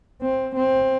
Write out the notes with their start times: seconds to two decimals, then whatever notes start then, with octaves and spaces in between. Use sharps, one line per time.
0.22 C4
0.57 C4